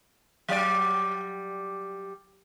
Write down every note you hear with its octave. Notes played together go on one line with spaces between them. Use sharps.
F#3 G3 D5